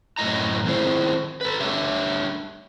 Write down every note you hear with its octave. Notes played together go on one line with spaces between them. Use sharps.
F#2 A2 A3 F#4 D#5 A#5
D#3 F3 C4 E4 G#4 C5
A4 B4
A3 D4 G4 E5